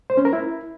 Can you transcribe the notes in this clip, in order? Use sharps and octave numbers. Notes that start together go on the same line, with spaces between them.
C5
C#4
A#4
E4